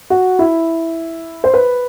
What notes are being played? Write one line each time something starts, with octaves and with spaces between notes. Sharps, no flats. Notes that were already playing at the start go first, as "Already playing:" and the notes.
F#4
E4
C5
B4